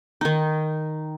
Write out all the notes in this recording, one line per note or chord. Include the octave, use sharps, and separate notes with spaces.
D#3 D#4